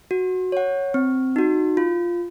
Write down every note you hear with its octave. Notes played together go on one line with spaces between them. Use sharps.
F#4
C#5 F#5
C4
D#4 F#4
F4